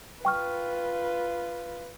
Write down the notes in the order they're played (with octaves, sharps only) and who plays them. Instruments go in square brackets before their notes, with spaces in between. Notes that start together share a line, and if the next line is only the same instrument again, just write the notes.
[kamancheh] F4 B4 [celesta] G5 C#6 F6